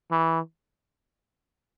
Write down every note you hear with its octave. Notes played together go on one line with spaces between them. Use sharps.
E3